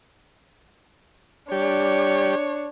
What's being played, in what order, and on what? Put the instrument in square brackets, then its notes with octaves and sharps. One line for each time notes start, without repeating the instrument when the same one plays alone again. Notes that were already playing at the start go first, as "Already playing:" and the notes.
[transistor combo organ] G3 G4 D5 [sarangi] D4 [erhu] C#5